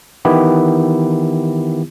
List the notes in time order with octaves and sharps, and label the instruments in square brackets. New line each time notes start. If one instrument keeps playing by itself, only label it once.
[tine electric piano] D#3 E3 B3 E4 G4